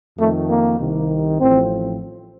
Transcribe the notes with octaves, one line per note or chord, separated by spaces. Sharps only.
F2 D#3 A3
A#3
C2 C3 D#3
A1 A2 F3 C4